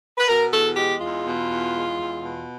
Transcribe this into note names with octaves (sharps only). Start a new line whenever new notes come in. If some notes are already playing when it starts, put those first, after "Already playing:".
B4
B2 A#4
E2 A4
G#3 G4
E2 F4
B2
E2
G#3
E2
B2